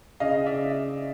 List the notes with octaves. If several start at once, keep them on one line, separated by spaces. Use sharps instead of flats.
C#3 D#5 F5
D5 E5